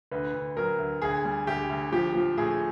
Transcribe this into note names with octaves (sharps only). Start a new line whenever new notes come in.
D2 B4
D2
F#3 A#4
D2
D2 G#4
G3
D2 G4
D2
F3 G4
F3
A2 G#4